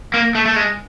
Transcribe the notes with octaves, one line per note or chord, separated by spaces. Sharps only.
A#3
A3
A3
G#3